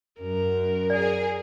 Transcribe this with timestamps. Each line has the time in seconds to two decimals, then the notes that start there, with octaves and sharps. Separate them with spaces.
0.20 F#2 A#4
0.90 G#4 D5